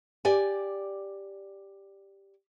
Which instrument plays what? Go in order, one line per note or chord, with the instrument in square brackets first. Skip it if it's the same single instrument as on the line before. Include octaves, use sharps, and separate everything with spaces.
[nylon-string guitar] G4 D5 G#5